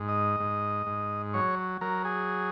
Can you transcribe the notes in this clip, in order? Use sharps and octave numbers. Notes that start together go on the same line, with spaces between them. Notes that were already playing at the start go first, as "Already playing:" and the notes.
Already playing: G#2
D#5
G#2
G#2
F#3 C#5
F#3 A#4
G#4